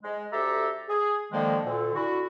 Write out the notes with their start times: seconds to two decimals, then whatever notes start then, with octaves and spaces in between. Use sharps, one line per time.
0.03 G#3
0.32 D2 G4 A4 E5 A#5
0.88 G#4
1.32 D3 D#3 F3 G#3 A#3
1.64 D2 A#2 D3
1.95 D3 E4 F#4